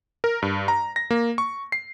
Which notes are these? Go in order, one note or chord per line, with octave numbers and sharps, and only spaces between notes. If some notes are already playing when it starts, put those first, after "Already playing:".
A#4
G2
A#5
A#6
A#3
C#6
C7